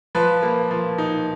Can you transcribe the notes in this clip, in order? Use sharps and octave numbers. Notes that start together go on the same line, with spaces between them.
F3 B4
A#3
F3
D#4